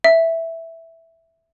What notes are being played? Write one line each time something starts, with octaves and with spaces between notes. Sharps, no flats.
E5